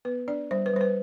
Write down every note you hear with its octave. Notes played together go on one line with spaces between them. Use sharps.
B3 B4
D4 D5
G3 C5
B4
G3 C5
B4